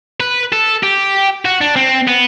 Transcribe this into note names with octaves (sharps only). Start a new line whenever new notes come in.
B4
A4
G4
F#4
D4
C4
B3